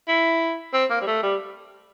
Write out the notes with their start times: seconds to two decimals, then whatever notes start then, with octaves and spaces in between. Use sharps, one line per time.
0.08 E4
0.73 C4
0.90 A#3
1.01 G3
1.07 A3
1.23 G3